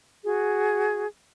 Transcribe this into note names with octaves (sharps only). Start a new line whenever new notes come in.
F#4 G#4